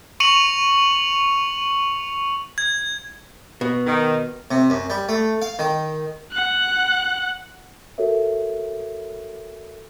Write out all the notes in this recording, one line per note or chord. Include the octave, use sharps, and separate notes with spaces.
C#6 C#7 D#7 F7 F#7
G#6
B2
D#3
C3
F#2
G3
A3
F5
D#3
F#5 F#6
F#4 A4 A#4 C#5 E5